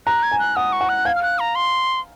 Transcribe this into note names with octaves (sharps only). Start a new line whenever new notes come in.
A#5 F#6
G#6
G#5
F#6
F#5 D#6
C#6
F#5
F#6
F5 G#6
F6
F#6
A#5
C6